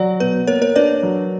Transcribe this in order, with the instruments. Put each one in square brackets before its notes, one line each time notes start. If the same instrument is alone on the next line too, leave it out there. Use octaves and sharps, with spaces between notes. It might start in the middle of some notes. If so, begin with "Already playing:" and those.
Already playing: [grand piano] F#3 [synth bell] D5 F#5
[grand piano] B2 [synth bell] B4
[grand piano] A#3 [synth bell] A#4 C#5
[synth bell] A#4 C#5
[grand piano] D4 [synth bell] B4 D5
[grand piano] F#3